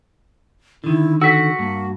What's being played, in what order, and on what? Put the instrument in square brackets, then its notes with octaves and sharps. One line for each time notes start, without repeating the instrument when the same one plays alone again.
[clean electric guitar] D3 D#3 [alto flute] E4
[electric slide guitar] F#4 [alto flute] A4 [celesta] E6 B6
[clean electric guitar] G2 [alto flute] A#3